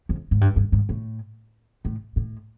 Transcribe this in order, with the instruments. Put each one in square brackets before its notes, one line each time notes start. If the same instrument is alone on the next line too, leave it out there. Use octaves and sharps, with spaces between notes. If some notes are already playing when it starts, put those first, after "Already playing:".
[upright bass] F2
G#2
G2
G2
G#2
A2
A2
A2